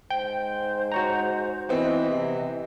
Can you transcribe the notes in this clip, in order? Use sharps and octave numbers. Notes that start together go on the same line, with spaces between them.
G#2 C5 G5
F#4 C#5 A#5
E3 B3 C4 D#5
C3